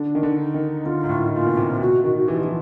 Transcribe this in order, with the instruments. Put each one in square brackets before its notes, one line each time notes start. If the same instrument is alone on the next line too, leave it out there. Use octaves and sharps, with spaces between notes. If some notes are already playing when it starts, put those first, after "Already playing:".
Already playing: [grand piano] D3 [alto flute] D4
[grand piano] D#3
D3
[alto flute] D#4
[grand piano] D#3
[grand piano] D3 [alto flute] F4
[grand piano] G#2
A2
[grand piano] A#2 [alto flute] F4
[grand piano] B2
C3
C3
[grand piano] B2 [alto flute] F#4
[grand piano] D#3 [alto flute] F#4
[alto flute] F#4
[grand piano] E3 [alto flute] G4
[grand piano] F3
E3